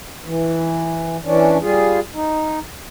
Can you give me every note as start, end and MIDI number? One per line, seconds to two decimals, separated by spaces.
0.24 1.17 52
1.24 1.58 52
1.24 1.58 61
1.24 1.58 62
1.62 1.99 55
1.62 1.99 65
1.62 1.99 68
2.14 2.59 63